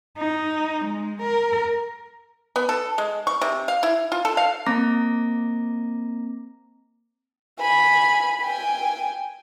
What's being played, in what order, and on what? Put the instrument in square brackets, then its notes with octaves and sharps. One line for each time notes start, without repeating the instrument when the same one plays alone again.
[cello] D#4
G#3
A#4
[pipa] B3
A4
G#3
C#6
C3
F5
E4
F4
A4
F5
[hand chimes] A#3 C4 A#5 D6 A#6
[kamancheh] G#5 B5
G5 G#5